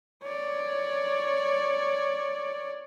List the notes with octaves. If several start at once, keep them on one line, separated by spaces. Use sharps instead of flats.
C#5 D5